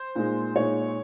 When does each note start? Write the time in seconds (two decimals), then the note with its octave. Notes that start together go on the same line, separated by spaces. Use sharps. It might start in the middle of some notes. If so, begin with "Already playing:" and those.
Already playing: C5
0.16 A#2 G#3 D#4
0.56 A#2 G#3 D#4 C#5